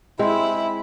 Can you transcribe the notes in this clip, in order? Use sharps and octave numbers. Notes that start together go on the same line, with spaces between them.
G#3 C4 E4